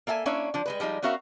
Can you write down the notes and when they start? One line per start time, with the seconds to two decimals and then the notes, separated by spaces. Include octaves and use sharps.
0.07 A#3 A4 E5 G5 G#5
0.25 A#3 C#4 D4 E4 C#5 E5
0.54 F3 D4
0.66 G3 G#3 B4
0.80 F3 G3 G#3 D#4
1.02 B3 C#4 F#4 A#4 E5 F5